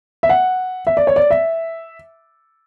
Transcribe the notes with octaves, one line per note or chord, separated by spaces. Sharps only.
E5
F#5
E5
D5
C#5
D5
E5